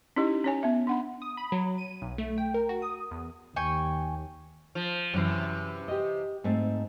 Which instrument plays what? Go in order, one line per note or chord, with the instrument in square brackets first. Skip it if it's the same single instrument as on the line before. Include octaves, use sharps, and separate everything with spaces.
[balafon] C#4 D#4 E4 G4 D#5
C#4 C#5 G#5
B3 E5
D4 F#5 B5
[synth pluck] D#6
B5
F#3
D#7
B1
A3
G5
A#4
F#4
D#6
E2
[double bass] D#2 [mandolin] G5 G#5 C#6
[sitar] F3
[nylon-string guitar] F#2 [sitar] C3 E3
[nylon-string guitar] G4 D#5
G#2 A3 C4